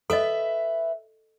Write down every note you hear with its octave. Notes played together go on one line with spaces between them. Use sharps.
A4 B4 D#5 E5